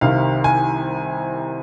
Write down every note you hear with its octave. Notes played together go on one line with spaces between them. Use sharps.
C2 C3 D#3 F5
G#5